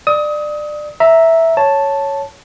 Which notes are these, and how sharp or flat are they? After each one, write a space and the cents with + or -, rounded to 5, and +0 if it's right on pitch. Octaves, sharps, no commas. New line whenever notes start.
D5 +25 D#6 +30
E5 -5 A#5 +0
C#5 +0 A5 +0